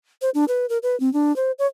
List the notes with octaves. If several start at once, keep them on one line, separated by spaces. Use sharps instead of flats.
C5
D4
B4
A#4
B4
C4
D4
C5
C#5